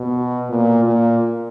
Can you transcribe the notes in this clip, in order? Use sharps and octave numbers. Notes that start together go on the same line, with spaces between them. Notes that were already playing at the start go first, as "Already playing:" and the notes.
Already playing: B2
A#2
A#2